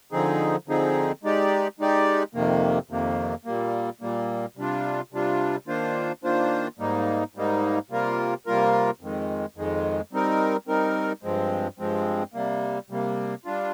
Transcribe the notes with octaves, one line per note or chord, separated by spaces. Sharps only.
D3 F3 C4 D#4 G#4
D3 F3 C4 D#4 G#4
G#3 D#4 G4 D5
G#3 D#4 G4 D5
F2 C3 D#3 A#3
F2 C3 D#3 A#3
A#2 G3 A#3
A#2 G3 A#3
C3 G3 D4 F4
C3 G3 D4 F4
D#3 A#3 D4 F4 C5
D#3 A#3 D4 F4 C5
G#2 G3 A#3 D#4
G#2 G3 A#3 D#4
C3 G3 A#3 F4 A#4
C3 G3 A#3 F4 A#4
F2 D#3 G#3
F2 D#3 G#3
G3 C4 D#4 A#4
G3 C4 D#4 A#4
G2 F3 G#3 C4
G2 F3 G#3 C4
C3 G3 A#3
C3 G3 A#3
G3 D4 F4